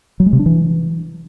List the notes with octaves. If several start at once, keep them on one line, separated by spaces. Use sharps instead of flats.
F#3
G#3
C3
D4
E3